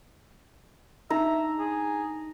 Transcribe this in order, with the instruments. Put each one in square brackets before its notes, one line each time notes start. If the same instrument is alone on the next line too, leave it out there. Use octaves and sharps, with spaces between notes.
[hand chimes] D4 D#4 [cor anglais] E5 [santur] A#5
[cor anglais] G#4